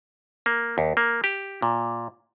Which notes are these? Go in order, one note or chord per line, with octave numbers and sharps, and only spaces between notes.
A#3
D#2
A#3
G4
A#2